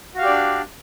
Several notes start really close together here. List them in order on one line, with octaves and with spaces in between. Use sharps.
F#4 F5 G4 D5 D4